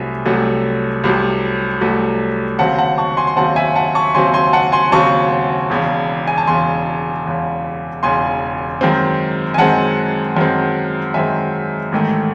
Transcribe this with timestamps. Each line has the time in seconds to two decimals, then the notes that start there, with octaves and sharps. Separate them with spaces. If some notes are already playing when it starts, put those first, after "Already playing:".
Already playing: C2 C3 F#3 A3 E5 G#5
0.25 C2 C3 F#3 A3
1.04 C2 C3 F#3 A3
1.81 C2 C3 F#3 A3
2.59 D#2 C#3 F#3 C4 F#5 A5
2.78 F#5 A5
2.98 A5 C#6
3.17 G#5 C6
3.27 C6
3.36 D#2 C#3 F#3 C4 F#5 A5
3.56 E5 G#5
3.76 F#5 A5
3.95 A5 C#6
4.14 D#2 C#3 F#3 C4 G#5 C6
4.34 G#5 C6
4.53 F#5 A5
4.72 G#5 C6
4.92 D#2 C#3 F#3 C4 A5 C#6
5.70 E1 E2 C#3
6.27 G#5
6.38 A5
6.47 E1 E2 C#3 G#5 C6
7.25 E1 E2 C#3
8.03 E1 E2 C#3 G#5 C6
8.81 F#2 D#3 G#3 C4
9.54 G#5
9.58 F#2 D#3 G#3 C4 F#5 A5
10.37 F#2 D#3 G#3 C4
11.14 F#2 D#3 G#3 C4 E5 G#5
11.92 A1 G#2 D#3 A3